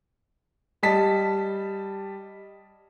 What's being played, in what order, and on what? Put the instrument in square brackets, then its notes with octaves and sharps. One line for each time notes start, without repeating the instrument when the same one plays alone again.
[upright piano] G3 D#5 A5 B6